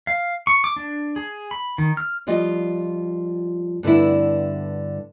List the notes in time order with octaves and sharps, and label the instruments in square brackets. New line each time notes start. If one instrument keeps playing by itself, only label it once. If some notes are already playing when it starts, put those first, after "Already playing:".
[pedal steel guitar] F5
C#6
D6
D4
G#4
B5
D#3
F6
[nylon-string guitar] F2 G3 F4 D#5
G2 D3 B3 E4